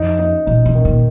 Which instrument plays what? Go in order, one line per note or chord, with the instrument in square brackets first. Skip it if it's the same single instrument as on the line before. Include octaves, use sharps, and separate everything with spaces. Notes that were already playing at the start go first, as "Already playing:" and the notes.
Already playing: [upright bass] F2 [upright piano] D#4
[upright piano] D#4
[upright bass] A#2 [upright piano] D#4
[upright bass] B2
[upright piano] D#3
[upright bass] A#2